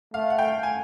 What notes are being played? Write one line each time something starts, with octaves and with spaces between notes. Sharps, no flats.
A3 F5
F#5
G5
G#5